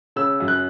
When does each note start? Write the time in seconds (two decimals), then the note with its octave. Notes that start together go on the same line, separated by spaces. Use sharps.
0.16 C#3 E6
0.40 F#2
0.48 F#6